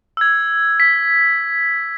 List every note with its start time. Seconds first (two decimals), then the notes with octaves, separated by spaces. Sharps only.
0.17 E6 G#6
0.80 B6